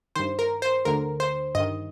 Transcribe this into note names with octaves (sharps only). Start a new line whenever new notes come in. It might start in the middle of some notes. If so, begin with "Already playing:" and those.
G2 D#3 C5
A#4
C5
D2 D3 A#4
C5
G2 D#5
D#3